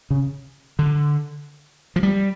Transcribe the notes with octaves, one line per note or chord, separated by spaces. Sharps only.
C#3
D3
F3
G3